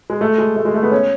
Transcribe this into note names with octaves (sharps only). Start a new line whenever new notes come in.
G#3
A3
G#3
A3
G#3
A3
B3
C#4